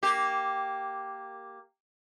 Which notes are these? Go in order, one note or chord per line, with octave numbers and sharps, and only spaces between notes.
A#3 G4